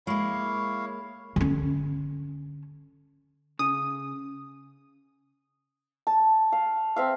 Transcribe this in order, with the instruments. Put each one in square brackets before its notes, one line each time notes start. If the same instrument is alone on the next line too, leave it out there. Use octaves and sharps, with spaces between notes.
[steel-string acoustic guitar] G#3 A#3 [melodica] E4 C#5 F5
[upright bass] D3 C#4
[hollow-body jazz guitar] C#3 [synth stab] D#6
[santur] A5
F5
C4 E5 F5